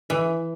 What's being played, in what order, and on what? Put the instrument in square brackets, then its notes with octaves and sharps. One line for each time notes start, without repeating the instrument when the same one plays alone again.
[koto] E3